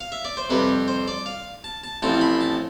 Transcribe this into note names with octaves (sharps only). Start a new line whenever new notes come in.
F5
E5
D5
C5
F2 C3 G3 B4
C5
D5
F5
A5
A5
A1 A2 F3 C4 A5
B5
A5